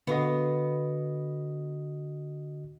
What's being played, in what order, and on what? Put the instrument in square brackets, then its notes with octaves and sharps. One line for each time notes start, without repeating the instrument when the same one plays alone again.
[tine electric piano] D3 F#4 D#5 [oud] B3 F5